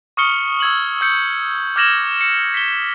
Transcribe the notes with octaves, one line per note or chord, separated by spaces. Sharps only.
C#6 D#6 F6 C#7 G7
E6 G#6 F#7
E6 G6 C#7
D6 F6 G#6 A#6 E7 F#7
C#7
B6 G7